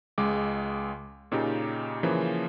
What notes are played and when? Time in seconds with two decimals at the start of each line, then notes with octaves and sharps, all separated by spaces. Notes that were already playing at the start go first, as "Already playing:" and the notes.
0.18 C#2 G#3 D6
1.32 A#2 C#3 D#4 G4
2.03 C#3 E3 F3 A#3